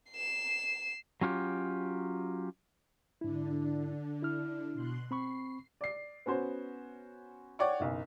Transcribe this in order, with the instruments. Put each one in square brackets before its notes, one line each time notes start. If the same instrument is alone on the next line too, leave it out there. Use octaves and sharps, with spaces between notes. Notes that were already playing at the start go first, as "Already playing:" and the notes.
[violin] C7 E7
[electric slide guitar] F#3 C#4 F4 G4
[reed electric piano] G#2 E4 [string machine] D3 D4
[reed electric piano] E4 F6
[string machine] B2 C6 F#6
[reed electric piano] C4 B5 C#6 [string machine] C7
[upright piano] D5 C7
B3 C#4 F#4 C5
C#5 D5 F#5 G5 C#6
F#1 B1